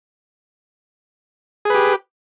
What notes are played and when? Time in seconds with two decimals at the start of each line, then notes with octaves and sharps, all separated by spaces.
1.65 G#4
1.70 B4
1.75 G4